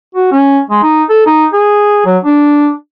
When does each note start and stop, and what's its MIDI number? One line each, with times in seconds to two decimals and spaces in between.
0.15 0.28 66
0.32 0.61 61
0.70 0.82 56
0.83 1.04 63
1.10 1.24 69
1.26 1.47 63
1.53 2.02 68
2.05 2.18 54
2.24 2.71 62